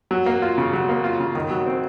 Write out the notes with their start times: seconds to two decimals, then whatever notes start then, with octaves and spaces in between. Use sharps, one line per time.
0.11 F#3
0.26 A#3
0.42 F4
0.58 C#3
0.73 F#3
0.89 A#3
1.04 F4
1.20 C#3
1.35 D#3
1.50 F#3
1.66 C4